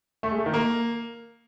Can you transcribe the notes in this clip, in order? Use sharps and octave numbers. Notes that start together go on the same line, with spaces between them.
A3
G#3
A3
D#3
A#3